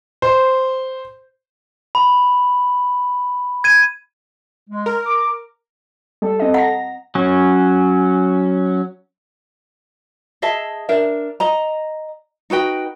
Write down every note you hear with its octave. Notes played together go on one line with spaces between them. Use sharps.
C5
B5
G#6 D#7
G#3
A#4
D6
G3 A4
C4 D#5
F#5 A#5 A#6
F#3 C#4
G#4 D#5 E5 A5
D4 A#4 E5
D#5 A#5
D#4 F#4 B4 G5